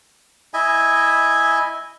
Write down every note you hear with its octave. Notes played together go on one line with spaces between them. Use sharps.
E4 D#5 E5 G#5